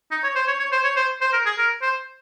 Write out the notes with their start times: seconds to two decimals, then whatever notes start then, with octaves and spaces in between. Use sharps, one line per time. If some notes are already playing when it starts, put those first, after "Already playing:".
0.11 D#4
0.24 C#5
0.36 C5
0.48 C#5
0.60 C#5
0.72 C5
0.84 C#5
0.97 C5
1.21 C5
1.33 A#4
1.46 G#4
1.58 A#4
1.82 C5